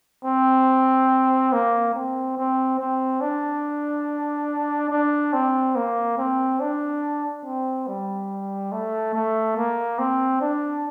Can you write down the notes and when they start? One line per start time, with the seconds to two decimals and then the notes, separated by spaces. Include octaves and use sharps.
0.25 C4
1.52 A#3
1.94 C4
2.37 C4
2.79 C4
3.21 D4
4.90 D4
5.33 C4
5.76 A#3
6.18 C4
6.60 D4
7.45 C4
7.87 G3
8.72 A3
9.14 A3
9.56 A#3
9.99 C4
10.41 D4